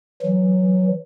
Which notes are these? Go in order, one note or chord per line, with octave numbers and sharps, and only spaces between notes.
E3 F#3